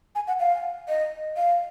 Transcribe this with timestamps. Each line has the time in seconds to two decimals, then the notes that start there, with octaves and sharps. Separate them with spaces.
0.15 G#5
0.27 F#5
0.40 F5
0.88 D#5
1.37 F5